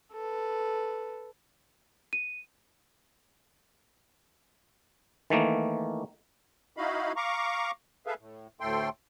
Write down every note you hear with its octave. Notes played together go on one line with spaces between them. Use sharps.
A4 B4
D#7
D#3 E3 A3 A#3
D#4 E4 F#4 D#5 F5 B5
F5 A#5 C#6 D6
G#4 A4 B4 E5 F5
A2
D2 A2 A3 A4 G5 C6